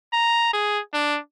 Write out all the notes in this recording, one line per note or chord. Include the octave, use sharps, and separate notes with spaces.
A#5
G#4
D4